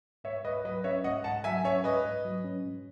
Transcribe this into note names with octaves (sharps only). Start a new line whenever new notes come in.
G#2 C#5 E5
G#2 B4 D#5
F#3 B4 D#5
C#4 C#5 E5
G#2 D#5 F#5
G#2 F#5 A5
F#3 E5 G#5
C#4 C#5 E5
G#2 B4 D#5
G#2
F#3
C#4
G#2